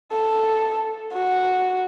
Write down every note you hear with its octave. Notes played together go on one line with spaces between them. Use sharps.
A4
F#4